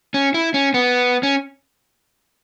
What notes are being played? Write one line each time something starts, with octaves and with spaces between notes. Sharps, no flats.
C#4
E4
C#4
B3
C#4